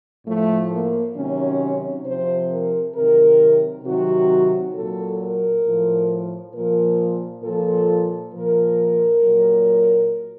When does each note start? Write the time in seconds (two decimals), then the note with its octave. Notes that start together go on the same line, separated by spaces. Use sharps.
0.26 A2 F3 A3
0.71 A#3
1.15 C3 D#3 F#3 C#4
2.05 C3 F3 C5
2.50 A#4
2.95 C3 D#3 F#3 A#4
3.84 C3 D#3 F#3 F#4
4.75 A#2 F#3 A4
5.19 A#4
5.64 A2 F3
6.54 A#2 F3 A#4
7.43 A#2 F3 A4
8.33 A#2 F3 A#4
9.23 A#2 F#3